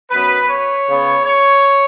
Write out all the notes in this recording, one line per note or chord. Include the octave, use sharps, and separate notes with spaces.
F#2 F#3 B3 B4
C#5
C#3 B3
C#5